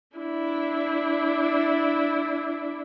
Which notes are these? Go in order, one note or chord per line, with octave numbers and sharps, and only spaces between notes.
D4 E4